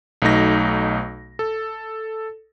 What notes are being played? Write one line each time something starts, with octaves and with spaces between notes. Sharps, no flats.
B1 B2 A3 D#4 A#6
A4